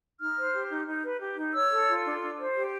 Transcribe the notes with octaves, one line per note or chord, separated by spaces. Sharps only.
D#4 F6
C5
G4
D#4
D#4
B4
G4
D#4
C#5 E6
A4
F4
D4
D4
C5
G4